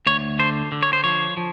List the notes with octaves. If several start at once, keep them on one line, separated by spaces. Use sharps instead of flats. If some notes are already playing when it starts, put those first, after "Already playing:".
D2 C#5
D3 C5
D3
C#5
C5
F3 C#5
F3